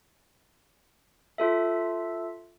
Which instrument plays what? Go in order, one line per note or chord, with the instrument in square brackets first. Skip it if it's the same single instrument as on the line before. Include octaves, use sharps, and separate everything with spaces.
[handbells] F4 A4 E5